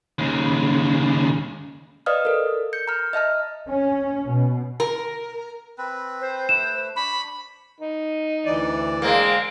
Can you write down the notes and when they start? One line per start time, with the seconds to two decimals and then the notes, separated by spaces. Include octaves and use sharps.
0.19 D#2 C#3
2.06 B4 D5 D#5 F5 D#6 F6
2.25 A4 A#4
2.73 G6 C#7
2.88 A#5 F6
3.13 D#5 E5 A5 F6
3.70 C#4
4.24 B2
4.80 A#4
5.78 C4 B4
6.21 C5
6.49 A3 B4 E7
6.96 D4 B5 C#6
7.81 D#4
8.46 D2 E3 D5
9.02 G#3 A#3 C4